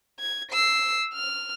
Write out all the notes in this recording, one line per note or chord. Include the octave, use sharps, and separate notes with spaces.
G#6
E6 C7
F6